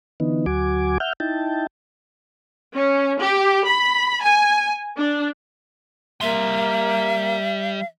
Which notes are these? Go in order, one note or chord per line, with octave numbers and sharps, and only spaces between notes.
D3 E3 B3 D#4
D2 F#3 F#4 G#5 D6
E5 F#5 F6 G6
D#4 E4 G5 A5
C#4
G4
B5
G#5
D4
G3 A#3 E5 C6